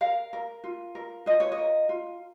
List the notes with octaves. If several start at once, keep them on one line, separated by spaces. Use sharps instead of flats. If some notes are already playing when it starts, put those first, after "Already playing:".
A#4 F5
A#4
F4
A#4
F4 D#5
C#5
D#5
A#4
F4